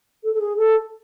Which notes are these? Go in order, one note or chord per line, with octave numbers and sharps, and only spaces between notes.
A4
A4
G#4
A4